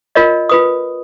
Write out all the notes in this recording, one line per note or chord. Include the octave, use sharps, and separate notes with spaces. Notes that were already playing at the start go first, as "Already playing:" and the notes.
F4 A#4 C#5 D#5
F4 B4 D#6